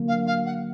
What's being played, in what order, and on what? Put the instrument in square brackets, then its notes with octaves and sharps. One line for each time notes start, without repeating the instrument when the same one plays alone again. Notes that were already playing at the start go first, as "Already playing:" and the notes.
Already playing: [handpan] D3 F#3 A#3
[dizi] F5
F5
F#5